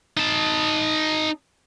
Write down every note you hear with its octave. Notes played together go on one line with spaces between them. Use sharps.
D#4 A5